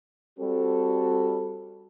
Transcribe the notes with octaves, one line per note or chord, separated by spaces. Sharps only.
G3 C4 F#4 A4